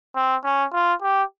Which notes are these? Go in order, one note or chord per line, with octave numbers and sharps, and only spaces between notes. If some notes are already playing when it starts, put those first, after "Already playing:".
C4
C#4
F4
G4